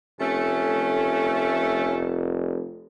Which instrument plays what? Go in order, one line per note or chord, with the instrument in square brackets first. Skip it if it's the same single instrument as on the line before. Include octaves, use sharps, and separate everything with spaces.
[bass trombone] F1 [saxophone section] A3 [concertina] C#4